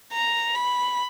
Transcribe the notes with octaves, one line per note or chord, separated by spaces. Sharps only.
A#5
B5